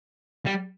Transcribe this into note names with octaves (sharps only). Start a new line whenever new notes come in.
G3